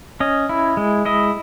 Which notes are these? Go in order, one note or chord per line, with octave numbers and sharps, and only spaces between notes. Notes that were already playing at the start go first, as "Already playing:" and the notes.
C#4 D#5
E4
G#3
E4 D#5